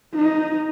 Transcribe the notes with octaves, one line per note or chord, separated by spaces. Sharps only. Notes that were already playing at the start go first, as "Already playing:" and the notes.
D#4